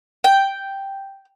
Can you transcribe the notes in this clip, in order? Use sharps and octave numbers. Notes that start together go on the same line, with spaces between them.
G5